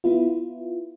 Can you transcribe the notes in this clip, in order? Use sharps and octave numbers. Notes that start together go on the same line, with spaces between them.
B3 E4 F4